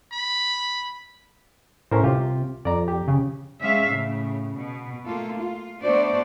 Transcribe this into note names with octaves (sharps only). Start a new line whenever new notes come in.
B5
A2 C#4 A#4 C5
C2 C3 F4 G4
F2 D5 A#5
G4
C#3
G#3 C#4 E5 F5
A2 C#3
B2
A3 A#3 F4 A4
F4
A3 B3 D4 F#4 C5 D5